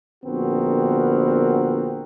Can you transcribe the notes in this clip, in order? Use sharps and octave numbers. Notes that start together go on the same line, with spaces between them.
A#1 D3 B3 C4 F#4 A#4